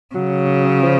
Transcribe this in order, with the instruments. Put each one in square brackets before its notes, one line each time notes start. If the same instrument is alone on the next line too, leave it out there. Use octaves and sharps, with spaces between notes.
[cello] C#3 [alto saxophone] F#3
[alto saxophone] F3